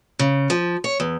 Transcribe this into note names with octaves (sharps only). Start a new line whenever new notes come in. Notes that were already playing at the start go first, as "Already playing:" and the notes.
C#3
F3
C#5
E2